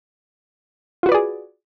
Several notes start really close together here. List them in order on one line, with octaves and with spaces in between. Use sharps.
F4 F#4 B4 D5 G#4